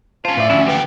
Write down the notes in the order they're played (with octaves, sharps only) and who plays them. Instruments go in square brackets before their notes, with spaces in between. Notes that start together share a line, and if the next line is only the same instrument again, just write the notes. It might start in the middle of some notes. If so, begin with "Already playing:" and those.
[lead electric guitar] C#4 C5 [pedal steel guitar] F4 [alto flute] A5
[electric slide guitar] A2 [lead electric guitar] B4 D5 [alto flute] E5
[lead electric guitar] D2 [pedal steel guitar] F3 D4 E4 [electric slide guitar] C#4
[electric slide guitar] E3 F3 G5 [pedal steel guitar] A3 A#3 G4 [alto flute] B4